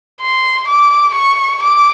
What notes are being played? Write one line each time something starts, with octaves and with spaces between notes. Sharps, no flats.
C6
D6
C#6
D6